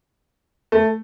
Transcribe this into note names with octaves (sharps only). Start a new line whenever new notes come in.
A3